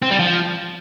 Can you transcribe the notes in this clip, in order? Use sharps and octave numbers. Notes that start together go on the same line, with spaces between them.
C4
G3
F3